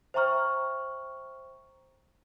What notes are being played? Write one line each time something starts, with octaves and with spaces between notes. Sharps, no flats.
C5 E5 G5 A#5 C#6 F6